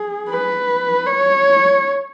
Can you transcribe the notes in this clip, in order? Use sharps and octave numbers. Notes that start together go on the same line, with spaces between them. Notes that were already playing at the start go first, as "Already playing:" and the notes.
Already playing: G#4
B4
C#5